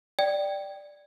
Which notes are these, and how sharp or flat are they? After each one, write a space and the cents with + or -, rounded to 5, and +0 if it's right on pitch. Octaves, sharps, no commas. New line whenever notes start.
D5 +0 G5 +0